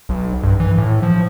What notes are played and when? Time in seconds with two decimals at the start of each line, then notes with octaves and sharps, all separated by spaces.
0.09 B1
0.43 G2
0.60 E3
0.78 A2
1.02 F3